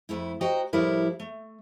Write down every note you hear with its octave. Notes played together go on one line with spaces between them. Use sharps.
F2 A3 E4
F#4 C5 D#5 G5 A#5
A2 F3 G3 E4 A4 A#4
A3